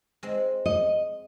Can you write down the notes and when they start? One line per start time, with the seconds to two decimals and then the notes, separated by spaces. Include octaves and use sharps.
0.23 G#3 C4
0.66 D#5